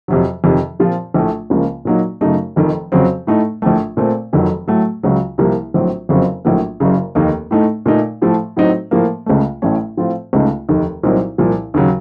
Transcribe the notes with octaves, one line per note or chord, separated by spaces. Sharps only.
F2 C3 F#3
F2 C3 D#3
A#2 F3 C4 F4
A#1 A2 A3
C#2 C#3 F3 A#3
A#2 F#3 A#3 D#4
F#2 C#3 A3 D#4
F1 F2 D#3
F2 C#3 F#3 C4
A2 A3 D#4
A#1 A2 A3
A#2 A3 C4
F1 F2 D#3 F#3
A2 F#3 A3
C#2 C#3 F#3
C2 C3 F3 A#3
A#1 A2 F#3 C4
F#1 F2 C#3 F#3 C4
A#1 A2 F#3 A#3
F#1 F#2 C#3
F1 D#2 D#3 A#3 D#4
A2 A3 D#4
A#2 A3 D#4
A2 F3 A3
A2 F#3 C4 D#4
A2 F3 A#3
C#2 C#3 A3
A1 A2 A3 C#4
A2 F3 C4 F4
C#2 C#3 A3 D#4
F1 D#2 D#3
C2 A#2 F#3 C4 D#4
C2 A#2 F3
D#2 C#3 F#3